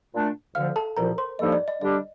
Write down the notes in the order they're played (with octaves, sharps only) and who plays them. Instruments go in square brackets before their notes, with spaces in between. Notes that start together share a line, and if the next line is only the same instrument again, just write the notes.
[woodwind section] A#2 A3 D4
[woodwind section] D2 D3 F3 [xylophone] F5 F6
[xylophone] A4 A5
[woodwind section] C2 A#2 F3 [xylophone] A#4 A#5
[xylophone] C5 C6
[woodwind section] G2 F3 A#3 D#4 A4 [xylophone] D#5
[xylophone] D5
D#5
[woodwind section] D3 G3 D4 G4 [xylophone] D#5